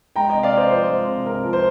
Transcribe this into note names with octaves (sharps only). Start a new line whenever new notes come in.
G#3 G5 A#5
C3 D#5 G5
D5 F5
C3
C5 D#5
F3 C5
G#3
C3
C3 A#4
F3
C5